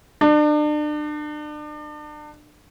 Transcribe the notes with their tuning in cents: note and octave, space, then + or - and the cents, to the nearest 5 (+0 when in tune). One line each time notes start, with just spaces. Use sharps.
D4 +35